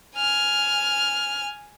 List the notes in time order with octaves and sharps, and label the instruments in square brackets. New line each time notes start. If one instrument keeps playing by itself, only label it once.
[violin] G#5 F6